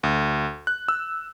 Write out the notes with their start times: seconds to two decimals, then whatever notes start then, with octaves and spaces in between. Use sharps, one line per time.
0.03 D2
0.67 F#6
0.88 E6